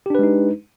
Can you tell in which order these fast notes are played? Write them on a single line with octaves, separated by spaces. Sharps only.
G4 D4 B4 G#3 D#4